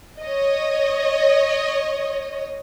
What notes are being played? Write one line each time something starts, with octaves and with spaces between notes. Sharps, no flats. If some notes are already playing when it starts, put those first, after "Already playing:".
C#5 D#5